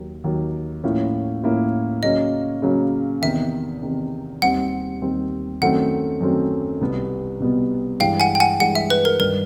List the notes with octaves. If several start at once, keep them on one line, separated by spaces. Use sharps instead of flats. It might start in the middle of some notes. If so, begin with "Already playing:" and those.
Already playing: D#2 D#3 F#3
D#2 D#3 F#3
A2 F3 A#3 C#4 E4
A2 F3 A#3 C#4 E4
C#3 F#3 A#3 C#4 D#5
C#3 F#3 A#3 C#4
E2 C3 D#3 E5
E2 C3 D#3
D#2 D#3 G3 C4 F#5
D#2 D#3 G3 C4
F#2 D#3 F#3 A3 C4 F#5
F#2 D#3 F#3 A3 C4
C2 B2 G3 B3
C2 B2 G3 B3
G2 E3 G#3 F5 G5
F#5 G#5
G5
F#5 G#5
G2 E3 G#3 F#5
E5
B4
A#4
G2 D#3 G3 A#4